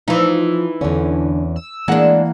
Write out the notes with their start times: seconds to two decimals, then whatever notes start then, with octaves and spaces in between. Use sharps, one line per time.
0.08 E3 F3 D#4
0.81 E2 D3 C#4
1.56 E6
1.88 E3 G#3 A#3 D4 F#5